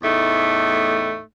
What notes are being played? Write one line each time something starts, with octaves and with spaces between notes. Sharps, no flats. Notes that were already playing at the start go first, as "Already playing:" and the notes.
E2 A2 A3 D#4